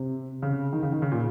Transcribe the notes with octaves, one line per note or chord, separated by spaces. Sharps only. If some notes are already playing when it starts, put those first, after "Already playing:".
Already playing: C3
C#3
D#3
C#3
D#3
C#3
A#2